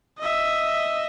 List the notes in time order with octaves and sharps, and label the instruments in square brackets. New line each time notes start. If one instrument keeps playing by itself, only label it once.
[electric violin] D#5 E5